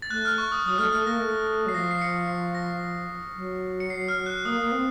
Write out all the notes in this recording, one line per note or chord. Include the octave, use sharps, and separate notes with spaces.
A6
A3 F#6
F6
C#6
D#6
F#3 D#6
A3 F6
A3 F6
A#3 A#6
A3
F#3 C7
F3 A#6
C7
C#7
C7
A#6
F#3
C#7
C7
F6
F#6
A#3 D#6
A#3
C4